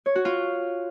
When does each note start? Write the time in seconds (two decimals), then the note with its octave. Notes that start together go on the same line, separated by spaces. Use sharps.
0.06 C#5
0.15 F#4
0.25 F4